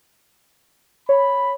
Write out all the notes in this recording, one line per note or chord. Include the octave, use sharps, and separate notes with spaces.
C#5 B5